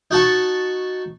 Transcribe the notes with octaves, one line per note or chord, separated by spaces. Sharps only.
D#4 F#4 A5 C#6